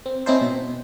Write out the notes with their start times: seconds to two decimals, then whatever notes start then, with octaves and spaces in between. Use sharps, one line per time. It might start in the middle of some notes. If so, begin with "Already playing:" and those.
0.06 C4
0.26 C4 C#4 D#4 E4 A4 C5
0.41 B2